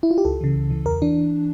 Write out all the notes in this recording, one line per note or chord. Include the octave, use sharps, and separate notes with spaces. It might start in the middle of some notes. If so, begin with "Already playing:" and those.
E4
F4
G4
C#2 A4
C#3 E3
C#2
C#3 E3
E2 A#4
E3 D4